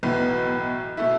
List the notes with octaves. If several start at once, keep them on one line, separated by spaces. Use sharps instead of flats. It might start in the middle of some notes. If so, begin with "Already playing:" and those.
B1 A2 E3 B3
B2 A3 E4